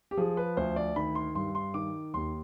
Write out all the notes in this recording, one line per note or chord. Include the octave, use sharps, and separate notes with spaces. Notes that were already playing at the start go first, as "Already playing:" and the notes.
G4
F3 G#4
B4
D2 C5
D5
D#3 B5
C6
G2 C6
C6
D#3 D6
D#2 C6